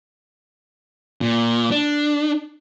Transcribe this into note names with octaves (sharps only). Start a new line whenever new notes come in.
A#2
D4